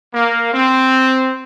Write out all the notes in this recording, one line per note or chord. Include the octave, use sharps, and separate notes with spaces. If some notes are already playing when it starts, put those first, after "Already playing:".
A#3
C4